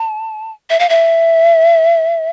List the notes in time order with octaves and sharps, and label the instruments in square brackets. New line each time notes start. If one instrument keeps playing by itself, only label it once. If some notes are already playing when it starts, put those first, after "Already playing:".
Already playing: [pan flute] A5
E5
F5
E5